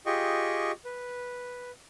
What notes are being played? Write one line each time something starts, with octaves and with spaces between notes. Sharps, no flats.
F4 G4 G#4 D#5 G5 C#6
B4